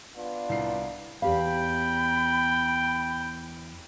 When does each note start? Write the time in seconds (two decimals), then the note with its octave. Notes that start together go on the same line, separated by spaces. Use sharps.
0.15 B3 D4 F4
0.49 C2 C7
1.22 E2 G4 F5 G5 B5